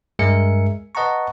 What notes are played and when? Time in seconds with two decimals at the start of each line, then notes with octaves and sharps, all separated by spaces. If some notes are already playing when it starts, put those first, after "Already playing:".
0.19 G2 G#3 A#4 E5 G#5 C#7
0.95 B4 D#5 F#5 A5 A#5 C#6